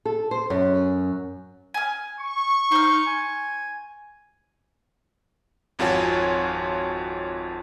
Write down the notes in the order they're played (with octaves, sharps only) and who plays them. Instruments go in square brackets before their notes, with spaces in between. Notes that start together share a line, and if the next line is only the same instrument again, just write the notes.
[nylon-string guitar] A4
C5
F#2
[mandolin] G#5 F6
[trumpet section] C#6
[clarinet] D#4 [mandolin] C5 F6
[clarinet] G#5
[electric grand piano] G#1 F2 F4 F#4 C#5 G#5